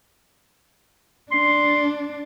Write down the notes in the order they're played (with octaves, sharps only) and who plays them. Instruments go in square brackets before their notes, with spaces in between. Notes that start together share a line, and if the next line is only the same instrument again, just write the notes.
[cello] D4 [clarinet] C6